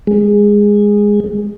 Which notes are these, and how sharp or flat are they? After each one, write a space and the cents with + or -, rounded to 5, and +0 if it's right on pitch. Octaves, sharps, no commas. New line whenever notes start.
G#3 -10